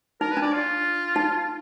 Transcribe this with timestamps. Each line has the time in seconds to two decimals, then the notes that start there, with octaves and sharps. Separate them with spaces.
0.21 D#4 A#4
0.32 B4
0.37 D4
0.42 D5
0.53 F4
1.16 D#4